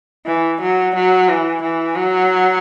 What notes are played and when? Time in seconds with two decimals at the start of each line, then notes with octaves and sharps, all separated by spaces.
0.26 E3
0.61 F#3
0.95 F#3
1.29 E3
1.63 E3
1.96 F#3